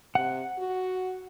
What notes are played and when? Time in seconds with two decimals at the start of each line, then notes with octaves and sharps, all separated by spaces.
0.15 C3 F#5
0.59 F#4